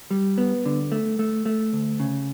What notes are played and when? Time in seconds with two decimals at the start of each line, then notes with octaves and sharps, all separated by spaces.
0.11 G3
0.38 B3
0.66 D3
0.92 A3
1.19 A3
1.46 A3
1.73 D2
2.00 C#3